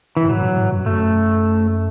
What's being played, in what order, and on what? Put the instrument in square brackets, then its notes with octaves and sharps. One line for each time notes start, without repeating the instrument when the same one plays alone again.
[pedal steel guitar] E3
[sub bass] F#2
[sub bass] G#2 [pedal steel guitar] F#3
[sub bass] A2
G#2
F#2
[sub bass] F#2 [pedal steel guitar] A3